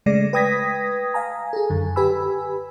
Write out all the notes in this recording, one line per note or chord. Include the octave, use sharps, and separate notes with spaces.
C#3 G#3 A3 D5 A#6
B4 G5 D#6 G#6 A#6 B6
F5 G#5 A#5
G#4 A4
F#2 D3
G4 B4 G#5 B5 E6